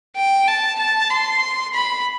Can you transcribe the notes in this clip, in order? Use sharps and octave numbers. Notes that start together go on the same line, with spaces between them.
G5
A5
A5
C6
B5